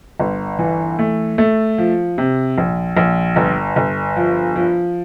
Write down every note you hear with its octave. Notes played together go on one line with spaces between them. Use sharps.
G1
E3
A3
A3
F3
C3
A#1
A#1
G1
G1
F3
F3